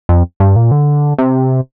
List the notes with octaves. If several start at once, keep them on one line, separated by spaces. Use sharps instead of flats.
F2
G2
A#2
D3
C3